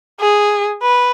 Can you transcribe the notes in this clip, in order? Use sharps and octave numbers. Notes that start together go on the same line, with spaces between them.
G#4
B4